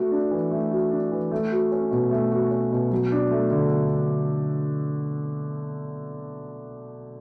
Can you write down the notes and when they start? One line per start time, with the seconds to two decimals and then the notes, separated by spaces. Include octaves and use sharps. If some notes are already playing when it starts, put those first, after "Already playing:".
Already playing: A3 F#4
0.12 D4
0.31 E3
0.51 A3
0.71 F#4
0.91 D4
1.12 E3
1.31 A3
1.52 F#4
1.72 C#4
1.91 B2
2.11 A3
2.32 F#4
2.51 C#4
2.72 B2
2.91 F#3
3.12 D4
3.31 A3
3.51 D3